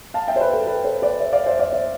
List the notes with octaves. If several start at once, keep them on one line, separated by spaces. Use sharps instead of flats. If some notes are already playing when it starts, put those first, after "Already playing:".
F5 A5
E5 G5
C5
B4
A4
B4
A4 C5
B4 D5
C5 E5
D5 F5
C5 E5
D5 F5
C5 E5